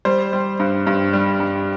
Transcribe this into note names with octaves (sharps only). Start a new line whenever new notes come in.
G3 C5
G3
G2
G2
G3
G2